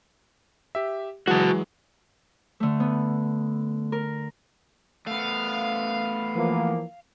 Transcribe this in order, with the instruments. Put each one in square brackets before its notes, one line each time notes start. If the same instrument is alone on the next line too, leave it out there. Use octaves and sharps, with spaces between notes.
[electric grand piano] G4 E5
[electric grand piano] E3 F#3 G#3 [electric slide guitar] F#4 A5
[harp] D3 A3
B3
A#4
[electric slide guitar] A3 B3 [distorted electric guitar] F5
[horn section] E3 F3 A#3